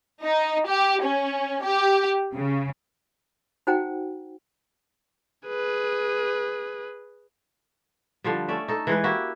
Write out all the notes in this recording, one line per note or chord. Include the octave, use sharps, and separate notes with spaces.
D#4
G4
C#4
G4
C#3
D#4 F#4 C5 F#5 G5 A#5
G#4 B4
D3 F3 G3
A3 C#4 D5 E5
D#4 A4
E3 G#3 B4
A#3 E4 F#4 G4